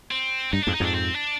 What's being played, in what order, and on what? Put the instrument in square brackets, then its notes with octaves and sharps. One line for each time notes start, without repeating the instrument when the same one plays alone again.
[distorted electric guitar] C4
[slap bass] G2 [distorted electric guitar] D#4
[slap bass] F2 G#2 [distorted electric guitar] D4
[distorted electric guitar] D#4
[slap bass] F2 G#2 [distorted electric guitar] D4
[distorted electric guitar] C4
D4